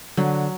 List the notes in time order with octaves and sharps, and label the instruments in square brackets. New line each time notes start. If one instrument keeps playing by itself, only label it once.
[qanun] D3 [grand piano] F#3